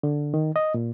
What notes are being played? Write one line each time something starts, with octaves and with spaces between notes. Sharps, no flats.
D3
D#3
D#5
A#2